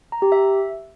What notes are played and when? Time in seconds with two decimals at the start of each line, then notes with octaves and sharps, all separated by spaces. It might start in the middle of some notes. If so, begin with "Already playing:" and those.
0.12 A#5
0.22 G4
0.32 E5